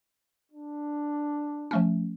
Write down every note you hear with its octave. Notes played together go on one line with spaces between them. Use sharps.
D4
F3 A3 C#4